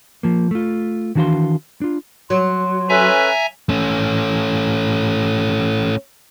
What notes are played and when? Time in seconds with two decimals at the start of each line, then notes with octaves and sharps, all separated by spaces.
0.23 F3 A#3
0.51 A3 F4
1.15 D#3 E3 D4 F#4 F5 C6
1.82 D4 F4
2.30 F#3 C6
2.89 C#4 A4 B4 E5 G#5 A#5
3.69 A3 C#4